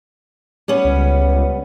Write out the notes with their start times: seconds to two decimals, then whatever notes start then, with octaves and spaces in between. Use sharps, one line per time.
0.68 G3 B3 C#4
0.85 C#2